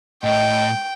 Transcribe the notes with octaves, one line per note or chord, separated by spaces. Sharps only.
A2 D#5 G5